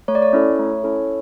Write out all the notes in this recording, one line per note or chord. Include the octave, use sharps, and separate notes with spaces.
A3 C#5
D5
C#5
C#4 E4 A4
A3
C#4 E4 A4